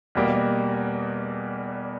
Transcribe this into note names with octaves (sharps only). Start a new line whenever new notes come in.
E2 B2 G3 A#3